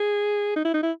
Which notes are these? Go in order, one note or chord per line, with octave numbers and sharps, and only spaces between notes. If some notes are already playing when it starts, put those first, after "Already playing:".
Already playing: G#4
D#4
E4
D#4
E4